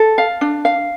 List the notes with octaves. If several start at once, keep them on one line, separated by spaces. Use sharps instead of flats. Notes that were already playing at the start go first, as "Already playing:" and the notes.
Already playing: A4
F5
D4
F5